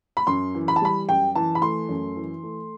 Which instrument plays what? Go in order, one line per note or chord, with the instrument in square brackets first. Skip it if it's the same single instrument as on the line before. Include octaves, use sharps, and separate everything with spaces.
[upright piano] B5
F#2 C6
E3
B5
A5
G3 B5
F#2 G5
E3 A5
B5
A3 C6
F#2
E3
A3